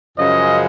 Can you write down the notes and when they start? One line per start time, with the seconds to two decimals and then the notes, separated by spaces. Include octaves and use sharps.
0.17 F#2 C#3 F3 G#3 D#5